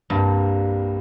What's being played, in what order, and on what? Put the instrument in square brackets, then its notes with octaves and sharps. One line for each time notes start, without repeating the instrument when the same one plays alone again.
[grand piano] C2 C3 G3 A#3 F4 [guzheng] G2